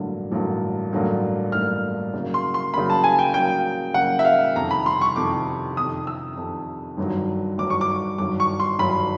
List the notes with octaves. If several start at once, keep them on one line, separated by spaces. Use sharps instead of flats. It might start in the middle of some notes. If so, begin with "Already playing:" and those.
Already playing: A1 G2 D3 F#3 A#3
A1 G2 D3 F#3 A#3
A1 G2 D3 F#3 A#3
A1 G2 D3 F#3 A#3 F6
C#3 F#3 A#3
C6
C6
C#3 F#3 A#3 B5
A5
G#5
G5
C#3 F#3 A#3 G5
C#3 F#3 A#3 F#5
E5
F5
F2 C3 D#3 A#5
B5
C6
C#6
F2 C3 D#3 D6
F2 C3 D#3 D#6
E6
F2 C3 D#3
G1 G2 D#3 F#3
G1 G2 D#3 F#3 D6
C#6
D6
G1 G2 D#3 F#3 D6
C#6
C6
G1 G2 D#3 F#3 B5